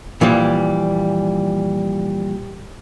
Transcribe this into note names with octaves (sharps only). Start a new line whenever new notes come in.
A#2 E3 F3 G3